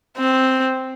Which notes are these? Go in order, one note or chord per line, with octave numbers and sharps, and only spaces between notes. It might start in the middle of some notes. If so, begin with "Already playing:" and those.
C4